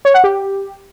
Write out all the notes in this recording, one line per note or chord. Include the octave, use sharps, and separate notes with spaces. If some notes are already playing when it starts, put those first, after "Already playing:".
C#5
F#5
G4